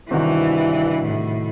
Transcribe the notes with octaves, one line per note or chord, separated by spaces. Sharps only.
G2 C3 D#3 E3 F#4
A2